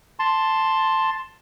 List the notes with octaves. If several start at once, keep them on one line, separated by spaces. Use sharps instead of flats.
A5 C6